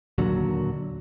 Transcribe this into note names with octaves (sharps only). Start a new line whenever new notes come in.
D#2 A#2 D3 F#3